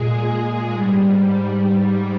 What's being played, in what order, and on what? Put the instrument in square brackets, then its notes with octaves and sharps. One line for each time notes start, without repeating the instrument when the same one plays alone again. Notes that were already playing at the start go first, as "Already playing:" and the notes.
Already playing: [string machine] A#2 G#3 G#4
G#2 G3